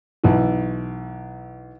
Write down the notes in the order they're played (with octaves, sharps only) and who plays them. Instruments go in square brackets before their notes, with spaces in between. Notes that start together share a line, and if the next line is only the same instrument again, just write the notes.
[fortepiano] B1 E3